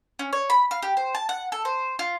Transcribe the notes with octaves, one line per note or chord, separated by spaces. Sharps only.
C#4
C#5
B5
F5
G4
C5
A5
F#5
A4
C5
F4